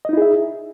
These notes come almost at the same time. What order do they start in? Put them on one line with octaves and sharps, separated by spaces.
D#5 D#4 E4 G#4 E5